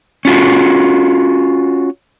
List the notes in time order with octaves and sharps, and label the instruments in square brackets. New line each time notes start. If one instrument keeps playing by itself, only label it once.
[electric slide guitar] C#4 F4 F#4